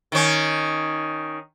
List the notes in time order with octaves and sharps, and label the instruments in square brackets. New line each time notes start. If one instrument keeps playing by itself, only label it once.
[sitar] D#3 C#4